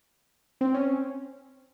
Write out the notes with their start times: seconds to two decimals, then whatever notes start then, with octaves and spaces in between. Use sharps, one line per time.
0.61 C4
0.74 C#4